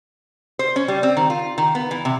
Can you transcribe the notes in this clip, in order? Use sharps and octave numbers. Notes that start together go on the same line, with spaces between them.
C5
C#4
G3
C4
D#3
F4
D#3
B3
E3
C3